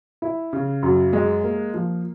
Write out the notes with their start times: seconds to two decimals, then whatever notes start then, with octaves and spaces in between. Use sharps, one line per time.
0.22 E4
0.53 C#3
0.83 F#2
1.13 G#3
1.44 A#3
1.74 F3